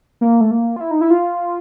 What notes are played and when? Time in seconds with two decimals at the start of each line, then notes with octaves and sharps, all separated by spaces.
0.21 A#3
0.41 A3
0.51 A#3
0.76 F4
0.81 E4
0.91 D#4
1.01 E4
1.11 F4